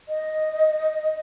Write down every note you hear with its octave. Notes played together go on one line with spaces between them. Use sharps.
D#5